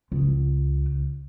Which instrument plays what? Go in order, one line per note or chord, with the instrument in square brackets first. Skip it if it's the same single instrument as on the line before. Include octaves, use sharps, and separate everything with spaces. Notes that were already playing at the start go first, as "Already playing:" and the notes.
[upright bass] C#2